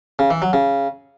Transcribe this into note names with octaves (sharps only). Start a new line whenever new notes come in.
C#3
E3
F#3
C#3